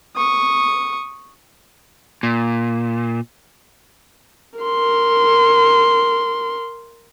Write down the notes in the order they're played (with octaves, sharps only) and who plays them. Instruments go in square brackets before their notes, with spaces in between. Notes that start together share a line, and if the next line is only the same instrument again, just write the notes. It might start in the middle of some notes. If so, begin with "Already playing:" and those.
[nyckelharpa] C#6 D#6
[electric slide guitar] A#2
[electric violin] A#4 C6